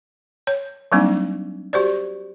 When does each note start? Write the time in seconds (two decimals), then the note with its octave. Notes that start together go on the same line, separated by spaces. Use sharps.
0.47 C#5
0.92 F#3 G3 A#3 C4 D4 D#4
1.73 F#4 G4 C5 D5